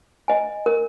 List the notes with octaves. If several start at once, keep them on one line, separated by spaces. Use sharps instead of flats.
D#5 G#5
A#4